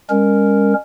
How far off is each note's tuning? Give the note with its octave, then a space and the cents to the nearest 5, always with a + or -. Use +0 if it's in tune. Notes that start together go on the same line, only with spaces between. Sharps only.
G#3 -40 C#4 +0 A#4 +0